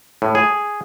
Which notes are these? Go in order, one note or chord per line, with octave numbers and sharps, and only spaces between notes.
A2
G#4